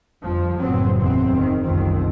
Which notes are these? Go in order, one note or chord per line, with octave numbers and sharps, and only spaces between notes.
G1 F2 F3
F#1 A2 F#3 B3 C4
F#1 E2 F#3 C4
D#3
F#1 C2 F2 D#3 C4